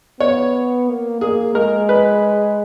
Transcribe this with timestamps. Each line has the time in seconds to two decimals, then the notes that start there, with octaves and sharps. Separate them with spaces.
0.20 B3 C#5
0.88 A#3
1.21 A#3 G#4
1.55 G#3 A#4
1.89 B4